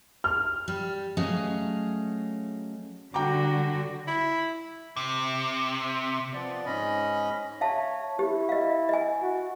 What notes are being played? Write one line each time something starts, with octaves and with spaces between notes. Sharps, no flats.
F6
G3
F#3 A3 C#4 G#4 D#5 F5
D3 G3 F#4 G5 A#5 D6
E4
C3
F3 B3 D5
G#2 C#4 D#5 B5
C#5 E5 F5 A5
E4 G4
D#5 F5
D#5 G#5
F#4